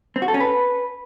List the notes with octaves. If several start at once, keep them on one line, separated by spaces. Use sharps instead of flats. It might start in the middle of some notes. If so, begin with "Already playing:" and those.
C4
F#4
A4
C#4
B4